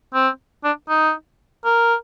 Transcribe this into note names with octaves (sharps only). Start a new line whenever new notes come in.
C4
D4
D#4
A#4